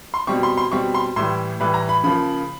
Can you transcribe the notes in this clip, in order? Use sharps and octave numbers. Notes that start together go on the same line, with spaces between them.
C6
B2 G3 C4 C#6
C6
C6
B2 G3 C4 C#6
C6
A2 E3 G3 C6
A2 E3 G3 B5
A#5
B5
C#3 F3 A#3 B5